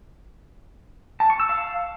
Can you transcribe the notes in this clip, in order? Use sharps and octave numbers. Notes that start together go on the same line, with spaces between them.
A5
C#6
E6
F5